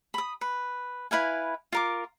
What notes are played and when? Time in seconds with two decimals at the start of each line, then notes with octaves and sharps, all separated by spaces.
0.14 B5 D#6
0.41 B4
1.11 E4 B4 F5 G#5
1.72 F4 A#4 D6